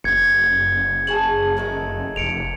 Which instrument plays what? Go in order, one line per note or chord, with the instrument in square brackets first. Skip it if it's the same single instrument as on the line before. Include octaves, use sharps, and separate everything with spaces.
[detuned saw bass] F#1 [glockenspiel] G#6 C#7
[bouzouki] C#3 G#4 A5 [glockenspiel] G#5 F#7
[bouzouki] D#3 G#3 A3
[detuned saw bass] F1 [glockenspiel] C#7 D7 F7